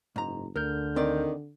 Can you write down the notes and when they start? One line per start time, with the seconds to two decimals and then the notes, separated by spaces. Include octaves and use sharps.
0.16 F#1 G#2 A#5
0.56 D2 D3 A#4 F6 G6
0.96 D#3 C4 D5